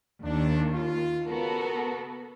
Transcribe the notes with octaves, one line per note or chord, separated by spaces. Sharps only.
D#2 D4
F4
C#3 B3 F#4 A4 A#4